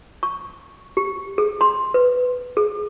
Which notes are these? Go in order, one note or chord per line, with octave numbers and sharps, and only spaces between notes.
C#6
G4
G#4
C6
B4
G#4